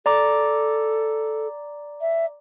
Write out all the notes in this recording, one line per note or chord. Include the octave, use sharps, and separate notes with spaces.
A4 D5 A#5 D6
E5